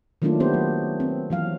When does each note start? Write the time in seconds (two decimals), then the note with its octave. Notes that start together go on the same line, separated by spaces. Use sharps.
0.22 D#3 F#3 A3 A#3 D4 F4
0.40 B3 D4 G4 C5
0.54 F#3
1.00 C4
1.30 E3 F#3 F5